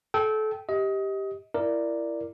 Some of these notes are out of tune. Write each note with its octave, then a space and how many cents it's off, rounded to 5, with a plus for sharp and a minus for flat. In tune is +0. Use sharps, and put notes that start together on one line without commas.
A4 -25 G5 -15
G4 +0 D#5 +25
E4 +20 A#4 +0 D5 +0